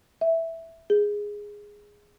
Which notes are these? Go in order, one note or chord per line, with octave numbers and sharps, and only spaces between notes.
E5
G#4